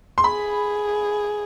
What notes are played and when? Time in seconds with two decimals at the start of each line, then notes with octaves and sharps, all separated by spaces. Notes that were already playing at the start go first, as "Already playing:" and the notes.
0.18 C6
0.24 G#4 B5